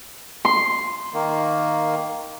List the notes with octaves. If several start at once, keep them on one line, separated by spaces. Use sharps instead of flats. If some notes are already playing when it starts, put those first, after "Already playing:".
C6
D#3 A#3